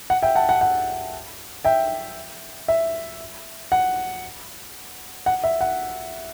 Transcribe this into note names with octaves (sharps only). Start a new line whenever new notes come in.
F#5
E5 G5
F#5 A5
F#5
F#5
E5 G5
E5
F#5
F#5
E5
F#5